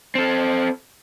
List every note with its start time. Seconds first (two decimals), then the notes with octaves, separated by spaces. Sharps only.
0.15 C4 A4